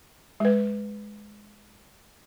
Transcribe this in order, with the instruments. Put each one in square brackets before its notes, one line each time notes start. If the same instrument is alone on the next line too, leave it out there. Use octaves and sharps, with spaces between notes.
[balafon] G#3 B4